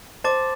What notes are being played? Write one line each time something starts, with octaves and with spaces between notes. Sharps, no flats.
C5 A5 D6 A6